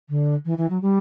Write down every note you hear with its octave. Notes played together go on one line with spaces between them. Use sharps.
D3
E3
E3
F#3
G3